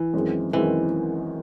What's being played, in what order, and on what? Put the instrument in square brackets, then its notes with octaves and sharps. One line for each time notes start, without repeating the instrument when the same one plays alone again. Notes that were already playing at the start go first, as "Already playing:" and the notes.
Already playing: [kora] E3
[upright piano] F#2 D#3 G#3 C4
[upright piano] F#2 D#3 G#3 C4 [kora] E3